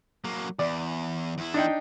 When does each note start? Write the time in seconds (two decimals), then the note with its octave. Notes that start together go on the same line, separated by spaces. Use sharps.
0.25 F#3 A#3
0.59 E2 D5
1.38 E2 E4
1.54 D4 D#4 G5